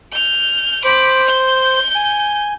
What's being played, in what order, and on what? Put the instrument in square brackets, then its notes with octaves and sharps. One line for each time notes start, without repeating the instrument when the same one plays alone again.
[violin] F6 G6
[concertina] C5 [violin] B5 D6
[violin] G6
[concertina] G#5